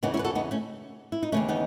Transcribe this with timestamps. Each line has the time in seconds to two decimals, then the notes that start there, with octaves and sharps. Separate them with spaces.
0.03 E2 C#3 E3 B3 D#4
0.14 C#4 E4
0.19 B4
0.24 F#4 A4
0.35 B3 D#4
0.51 A3 C#4
1.12 E4
1.23 D#4
1.32 D#2 C#3 E3 A3 C#4
1.48 B3 D#4